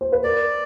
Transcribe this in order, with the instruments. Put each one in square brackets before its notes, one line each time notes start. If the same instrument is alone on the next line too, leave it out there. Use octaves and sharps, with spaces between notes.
[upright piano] C5
B4
[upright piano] A#4 [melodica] D5